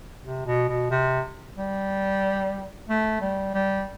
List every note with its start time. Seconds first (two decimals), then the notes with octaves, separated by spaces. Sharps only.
0.25 C3
0.46 B2
0.69 B2
0.91 C3
1.57 G3
2.89 A3
3.21 G3
3.54 G3